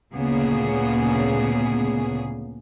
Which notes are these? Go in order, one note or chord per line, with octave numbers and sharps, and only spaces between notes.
D2 A#2 C#3 A#3 B3 G#4